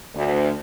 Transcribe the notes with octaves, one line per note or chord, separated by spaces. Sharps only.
D2